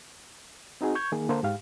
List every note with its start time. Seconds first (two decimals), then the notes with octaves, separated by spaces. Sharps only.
0.81 C4 D#4 F#4 G#4
0.95 C#6 G6 G#6
1.12 D#3 A#3 G#4
1.29 D3 A#3 A4 C5
1.43 G#2 G4 F5